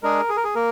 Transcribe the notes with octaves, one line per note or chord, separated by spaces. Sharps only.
G#3 D4 G#4 A#4
G#4
A#4
G#4
A#3 A#4